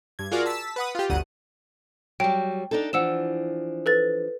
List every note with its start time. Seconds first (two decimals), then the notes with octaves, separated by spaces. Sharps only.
0.19 G2 G#6
0.32 F4 F#4 G#4 A#4 D5
0.46 A5 E6 B6
0.76 B4 F#5 D#6
0.95 F4 G4
1.10 G1 D2 F#5 D#7
2.20 F#3 G3 G5
2.71 D4 D#4 A4
2.93 E3 F3 D4 F#5 E6 E7
3.86 A4 B4 A6